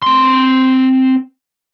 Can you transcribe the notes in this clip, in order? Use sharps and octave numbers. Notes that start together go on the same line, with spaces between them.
C4 C6